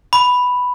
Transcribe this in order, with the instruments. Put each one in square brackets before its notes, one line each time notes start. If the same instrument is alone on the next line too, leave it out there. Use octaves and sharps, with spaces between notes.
[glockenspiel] B5